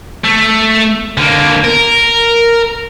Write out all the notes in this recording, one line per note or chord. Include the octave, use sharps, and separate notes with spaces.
A3
D3 A#3
A#4